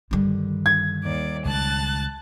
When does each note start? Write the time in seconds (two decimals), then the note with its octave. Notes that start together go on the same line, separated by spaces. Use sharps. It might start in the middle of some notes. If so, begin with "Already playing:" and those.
0.11 G2 D3 D#3 G3
0.66 G#6
1.05 D#2 D5
1.45 C#2 A5 F#6 A6